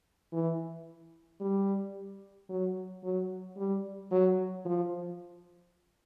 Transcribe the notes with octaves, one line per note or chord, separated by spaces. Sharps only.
E3
G3
F#3
F#3
G3
F#3
F3